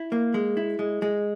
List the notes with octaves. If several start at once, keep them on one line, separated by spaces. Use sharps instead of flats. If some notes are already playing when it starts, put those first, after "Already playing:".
Already playing: E4
A#3
G#3
E4
G#3
G#3